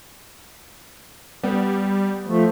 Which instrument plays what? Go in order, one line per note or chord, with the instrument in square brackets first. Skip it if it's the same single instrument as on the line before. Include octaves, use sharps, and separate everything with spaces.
[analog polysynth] G3 [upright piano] B3
[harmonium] F3 A3